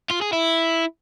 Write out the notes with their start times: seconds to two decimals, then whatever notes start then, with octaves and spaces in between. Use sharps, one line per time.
0.10 F4
0.21 G#4
0.33 E4